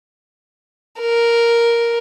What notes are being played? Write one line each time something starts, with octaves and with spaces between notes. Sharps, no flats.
A#4